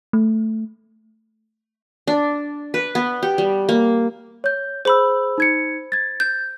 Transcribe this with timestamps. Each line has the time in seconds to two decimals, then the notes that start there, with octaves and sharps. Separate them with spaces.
0.13 A3
2.07 D4
2.74 B4
2.95 B3
3.23 G4
3.38 G3
3.69 A#3
4.44 C#5 G6
4.85 G#4 C5 B5 E6
5.38 D#4 G#6 C#7
5.92 G#6 A6
6.20 G6